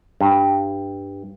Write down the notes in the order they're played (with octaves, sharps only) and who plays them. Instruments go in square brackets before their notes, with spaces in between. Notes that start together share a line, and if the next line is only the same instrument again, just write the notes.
[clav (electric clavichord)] G2